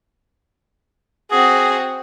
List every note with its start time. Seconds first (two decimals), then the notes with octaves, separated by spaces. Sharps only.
1.31 C4 F#4 G#4